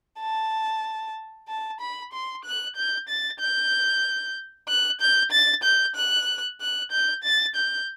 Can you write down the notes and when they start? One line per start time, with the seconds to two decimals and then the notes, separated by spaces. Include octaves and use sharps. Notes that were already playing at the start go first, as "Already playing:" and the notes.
0.20 A5
1.49 A5
1.81 B5
2.13 C6
2.45 F#6
2.76 G6
3.09 A6
3.40 G6
4.68 F#6
5.01 G6
5.32 A6
5.64 G6
5.96 F#6
6.60 F#6
6.91 G6
7.24 A6
7.56 G6